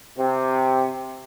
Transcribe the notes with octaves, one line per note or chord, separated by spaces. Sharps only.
C3